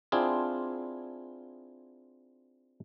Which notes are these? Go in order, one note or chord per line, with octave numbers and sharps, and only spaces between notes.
C4 D4 E4 F4 G#4